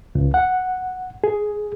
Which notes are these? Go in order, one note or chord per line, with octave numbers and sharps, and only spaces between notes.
C#2
F#5
G#4